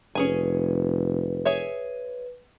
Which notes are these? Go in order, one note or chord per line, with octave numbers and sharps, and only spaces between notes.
F1 C#4 G#4 B4 G#5
G#4 C#5 E5